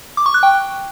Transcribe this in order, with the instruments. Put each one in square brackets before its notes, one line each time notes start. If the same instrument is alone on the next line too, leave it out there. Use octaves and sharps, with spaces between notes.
[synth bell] D6
C#6
F#6
G5